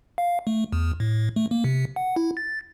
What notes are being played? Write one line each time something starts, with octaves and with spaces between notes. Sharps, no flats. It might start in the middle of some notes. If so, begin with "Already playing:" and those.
F5
A3
E2
A2
A3
A#3
C3
F#5
E4
A6